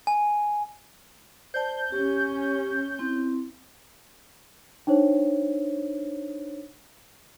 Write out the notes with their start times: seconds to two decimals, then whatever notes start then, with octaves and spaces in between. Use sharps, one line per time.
0.07 G#5
1.54 C5 D5 A5 G6
1.92 C#4 G4
2.99 C4 E4
4.87 D4 D#4 C5 C#5